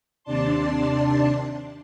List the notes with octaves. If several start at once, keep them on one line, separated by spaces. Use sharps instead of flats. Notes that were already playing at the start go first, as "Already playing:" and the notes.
D#2 C3 D4 D5 A5 C6